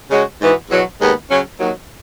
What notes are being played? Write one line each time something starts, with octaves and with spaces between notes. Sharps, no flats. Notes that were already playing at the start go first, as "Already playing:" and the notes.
C#3 G#3 C#4 F#4
G#2 E3 B3 F#4
E2 B2 F#3
D#2 D#3 G#3 B3
C#3 F#3 C#4
D#2 D#3 F#3